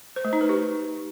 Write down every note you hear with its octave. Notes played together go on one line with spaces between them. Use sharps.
C5
A3
D#4
B4
G4